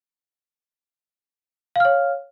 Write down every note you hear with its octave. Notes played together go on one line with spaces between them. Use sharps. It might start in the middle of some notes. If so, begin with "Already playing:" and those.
C#5 F5 F6